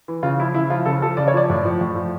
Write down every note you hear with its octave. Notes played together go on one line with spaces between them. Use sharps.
E3
C#3 F4
F3 E4
C#3 E4
F3 F4
C#3 A4
F3 A4
C#3 D5
C#5
F3 D5
A2
F3
A2
F3